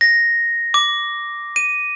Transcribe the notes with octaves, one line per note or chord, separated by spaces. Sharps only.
A#6
D6
D#7